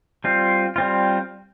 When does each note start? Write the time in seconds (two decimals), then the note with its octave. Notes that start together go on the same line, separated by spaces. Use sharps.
0.24 G3 C4 F4
0.76 G3 C4 F4